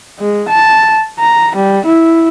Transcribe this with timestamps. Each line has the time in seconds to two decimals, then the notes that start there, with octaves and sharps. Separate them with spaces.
0.20 G#3
0.49 A5
1.20 A#5
1.56 G3
1.86 E4